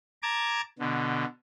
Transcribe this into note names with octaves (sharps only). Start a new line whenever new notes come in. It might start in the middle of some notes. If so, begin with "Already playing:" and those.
A5 A#5 D6 G#6
B2 D3